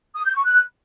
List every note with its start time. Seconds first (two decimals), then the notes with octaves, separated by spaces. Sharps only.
0.15 D#6
0.25 G6
0.34 C#6
0.44 F#6